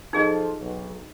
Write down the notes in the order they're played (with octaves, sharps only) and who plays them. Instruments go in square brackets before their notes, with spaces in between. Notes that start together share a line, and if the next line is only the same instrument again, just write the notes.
[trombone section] F3 F4 A4 [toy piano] D#4 G#4 D#5
[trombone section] B1